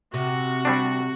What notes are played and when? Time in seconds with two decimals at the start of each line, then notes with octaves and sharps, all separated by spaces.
0.14 C3 F#4
0.65 G3 C4 D4